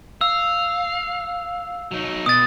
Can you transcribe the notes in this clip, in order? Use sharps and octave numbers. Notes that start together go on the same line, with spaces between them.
F5 E6
F#3 D#4
B2 D#6 A6